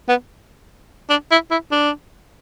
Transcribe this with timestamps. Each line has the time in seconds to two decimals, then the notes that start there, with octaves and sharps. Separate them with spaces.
0.09 B3
1.10 D4
1.31 E4
1.51 E4
1.72 D4